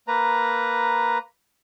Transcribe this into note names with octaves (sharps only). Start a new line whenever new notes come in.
A#3 B4 A#5